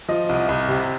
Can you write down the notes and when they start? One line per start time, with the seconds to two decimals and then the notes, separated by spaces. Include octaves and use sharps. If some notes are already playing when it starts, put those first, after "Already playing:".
0.09 F3 D#5
0.29 C2
0.49 C2
0.68 C3